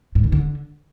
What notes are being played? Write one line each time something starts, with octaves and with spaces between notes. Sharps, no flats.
G#2
C#3
D3